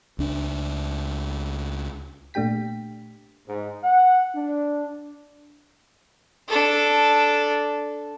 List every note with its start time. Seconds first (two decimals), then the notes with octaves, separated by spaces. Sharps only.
0.19 C#2 D4
2.34 A#2 A3 D4 G4 G5 B6
3.48 G#2
3.84 F#5
4.35 D4
6.48 D4 A4